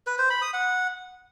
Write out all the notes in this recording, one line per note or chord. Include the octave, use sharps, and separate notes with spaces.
B4
C5
B5
D#6
F#5